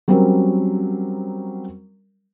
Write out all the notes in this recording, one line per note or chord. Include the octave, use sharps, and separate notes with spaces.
F#3 G3 C4 C#4 A#4